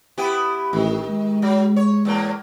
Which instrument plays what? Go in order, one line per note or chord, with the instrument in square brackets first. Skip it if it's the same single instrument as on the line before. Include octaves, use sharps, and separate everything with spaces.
[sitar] B3 E4 G4
[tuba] A1 [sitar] D#3
[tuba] G#3
[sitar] F#3
C#5
E2 A2 A#3